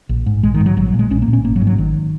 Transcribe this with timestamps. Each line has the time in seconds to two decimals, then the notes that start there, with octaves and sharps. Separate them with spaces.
0.09 A#1
0.26 G#2
0.43 A#1 G#3
0.54 D#3
0.60 G#2
0.66 F#3
0.77 A#1 F#3
0.88 F#3
0.94 A#2
0.99 G#3
1.10 A#1 C#4
1.22 A#3
1.28 A#2
1.33 C#4
1.45 G#1 A#3
1.56 F#3
1.61 G#2
1.67 F#3
1.78 G#1 D#3